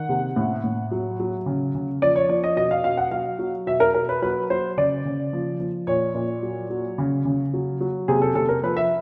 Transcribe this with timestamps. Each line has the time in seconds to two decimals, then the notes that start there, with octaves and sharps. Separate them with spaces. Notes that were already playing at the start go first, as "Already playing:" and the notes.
Already playing: D#3 F#5
0.09 C3
0.36 A2
0.64 A2
0.91 F#3
1.20 F#3
1.46 C#3
1.75 C#3
2.02 F3 D5
2.16 C#5
2.29 F3 D5
2.44 D#5
2.56 B2 D#5
2.71 F5
2.84 B2 F5
2.97 F#5
3.11 F#3 F5
3.39 F#3
3.67 B2 E5
3.80 A#4
3.94 B2 A#4
4.09 B4
4.22 F#3 B4
4.50 F#3 C5
4.77 C#3 D5
5.05 C#3
5.33 F3
5.60 F3
5.87 A#2 C#5
6.15 A#2
6.42 F#3
6.70 F#3
6.98 C#3
7.25 C#3
7.53 F#3
7.81 F#3
8.08 C3 G#4
8.22 A4
8.35 C3 A4
8.49 A#4
8.63 F3 B4
8.77 E5